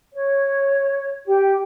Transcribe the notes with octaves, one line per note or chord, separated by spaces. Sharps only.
C#5
G4